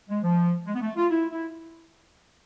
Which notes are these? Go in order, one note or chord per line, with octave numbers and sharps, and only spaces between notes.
G#3
F3
G#3
B3
A3
F4
E4
E4